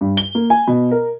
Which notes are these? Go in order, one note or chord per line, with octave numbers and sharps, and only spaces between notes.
G2
G7
A#3
G#5
B2
A#4